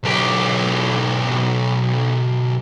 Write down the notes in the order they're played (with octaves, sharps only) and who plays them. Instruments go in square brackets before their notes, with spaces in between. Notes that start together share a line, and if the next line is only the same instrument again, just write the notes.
[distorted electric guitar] B1 G4